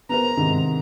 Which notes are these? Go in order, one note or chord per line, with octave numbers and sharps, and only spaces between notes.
B3 A#4 C5 A#5
G#2 C3 D#3